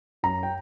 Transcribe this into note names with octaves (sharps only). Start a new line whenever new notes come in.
F#2 A#5
G5